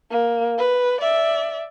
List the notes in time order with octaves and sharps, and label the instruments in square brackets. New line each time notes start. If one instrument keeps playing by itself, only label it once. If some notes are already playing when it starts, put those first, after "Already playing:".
[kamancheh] A#3
B4
D5 E5